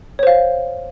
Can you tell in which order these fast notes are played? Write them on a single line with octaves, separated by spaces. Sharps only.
C#5 C5 F5